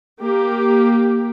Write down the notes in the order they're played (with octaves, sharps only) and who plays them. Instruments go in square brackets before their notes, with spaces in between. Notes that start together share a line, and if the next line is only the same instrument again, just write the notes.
[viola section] A#3 G4